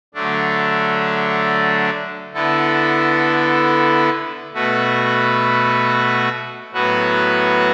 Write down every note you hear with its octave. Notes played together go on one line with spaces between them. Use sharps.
D3 F#3 A3 D4
D3 B3 E4 A4
B2 A3 F#4 B4
A2 F#3 B3 F#4 B4